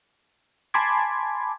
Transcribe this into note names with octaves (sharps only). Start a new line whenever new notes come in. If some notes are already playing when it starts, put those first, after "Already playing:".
G#5 A5 B5 C6 D6 G#6